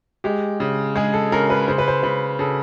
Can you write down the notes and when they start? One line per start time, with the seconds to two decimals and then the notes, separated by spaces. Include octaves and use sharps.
0.24 G#3 G4
0.60 C#3
0.96 G#3 G#4
1.14 A4
1.32 C#3 A#4
1.50 B4
1.68 C#3 C5
1.78 B4
1.88 C5
2.03 C#3 B4
2.39 C#3 A4